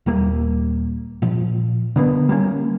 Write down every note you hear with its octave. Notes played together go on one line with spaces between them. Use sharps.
D#1 G3 A#3
A#2 F3
D3 A#3 B3
G3 A#3 C#4